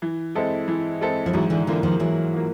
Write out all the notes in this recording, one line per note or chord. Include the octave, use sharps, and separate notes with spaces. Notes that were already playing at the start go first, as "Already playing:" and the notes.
E3
G#3 C4 E4 A4
E3
G#3 C4 E4 A4
F3
G#2 E3 F#3
D3 E3
D3 E3 F3 A#3
D#3 F3
G#2 E3 F#3
F3 A#3